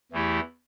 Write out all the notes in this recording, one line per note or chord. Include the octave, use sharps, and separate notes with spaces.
E2 E3 A3 E4 G4